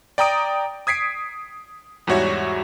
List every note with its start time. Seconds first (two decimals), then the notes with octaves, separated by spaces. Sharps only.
0.18 D5 G5 A#5 D#6 D7
0.87 D#6 G#6 B6 C7 D7
2.07 E2 G#2 G3 F#4 C#5 E5